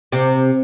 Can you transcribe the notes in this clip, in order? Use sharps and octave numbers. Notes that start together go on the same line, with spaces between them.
C3